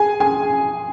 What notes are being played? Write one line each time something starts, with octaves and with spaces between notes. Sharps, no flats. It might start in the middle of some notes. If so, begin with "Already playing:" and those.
Already playing: G#4 G#5
G#4 G#5